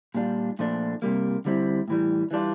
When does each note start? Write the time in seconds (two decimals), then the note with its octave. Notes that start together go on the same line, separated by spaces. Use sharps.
0.15 A#2 G3 D4 F4
0.59 A#2 F3 A3 D4
1.02 C3 G3 A#3
1.45 D3 G3 C4 E4
1.88 A2 E3 G3
2.31 E3 G3 D4 F4